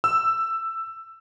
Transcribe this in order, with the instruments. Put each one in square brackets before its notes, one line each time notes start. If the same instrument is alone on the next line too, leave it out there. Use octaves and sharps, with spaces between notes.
[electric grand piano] E6